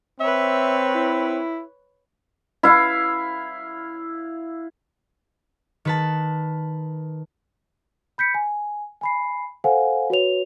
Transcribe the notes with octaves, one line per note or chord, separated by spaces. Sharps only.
C4 B4 C#5 E5
E4
E4 F5
D#3 B4 A5
B5 G6 B6 C#7
G#5
G#5 B5 C7
A4 C5 F5 F#5 G#5
F#4 B4 C#5 F7